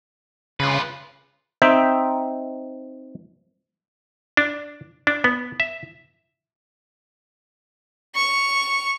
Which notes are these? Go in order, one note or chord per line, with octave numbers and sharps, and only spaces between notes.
C#3 F4 B4
C4 D#4 E5 G5
D4
D4
B3
E5
C#6 F7